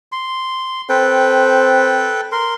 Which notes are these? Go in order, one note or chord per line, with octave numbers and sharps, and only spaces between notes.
C6
C4 A4 B4 G5
A#4 C6